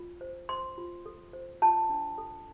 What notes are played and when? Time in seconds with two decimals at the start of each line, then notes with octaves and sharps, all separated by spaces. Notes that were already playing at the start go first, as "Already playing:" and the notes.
Already playing: F4
0.21 C5
0.49 C5 C6
0.78 F4
1.06 A4
1.33 C5
1.62 F4 A5
1.90 D4
2.18 A4